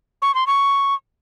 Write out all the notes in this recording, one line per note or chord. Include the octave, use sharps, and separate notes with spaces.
C#6
C6
C#6